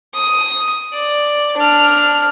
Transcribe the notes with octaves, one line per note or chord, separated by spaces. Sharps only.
D#6
D5
D4 F6